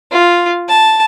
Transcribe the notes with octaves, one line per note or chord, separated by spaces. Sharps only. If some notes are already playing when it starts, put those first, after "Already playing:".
F4
A5